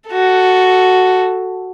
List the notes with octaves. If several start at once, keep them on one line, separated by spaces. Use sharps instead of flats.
F#4 A4